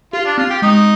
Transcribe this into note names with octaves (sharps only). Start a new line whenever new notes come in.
F4 G4
D4
C4 F4
G4
G#3 D#4